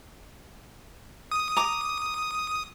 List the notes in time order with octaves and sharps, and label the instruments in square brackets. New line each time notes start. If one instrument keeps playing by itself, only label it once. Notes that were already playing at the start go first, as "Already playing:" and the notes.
[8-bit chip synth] D#6
[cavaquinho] A#5 D6